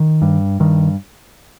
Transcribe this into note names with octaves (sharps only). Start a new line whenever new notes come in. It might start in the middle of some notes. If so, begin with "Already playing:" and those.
Already playing: D#3
G2
G2 D#3